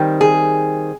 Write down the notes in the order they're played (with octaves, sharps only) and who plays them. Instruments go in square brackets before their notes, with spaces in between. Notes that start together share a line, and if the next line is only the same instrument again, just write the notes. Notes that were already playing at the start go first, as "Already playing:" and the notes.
Already playing: [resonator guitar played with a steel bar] D#3 G3 C4
G#4